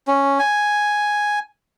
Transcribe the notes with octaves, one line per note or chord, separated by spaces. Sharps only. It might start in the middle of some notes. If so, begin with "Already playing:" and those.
C#4
G#5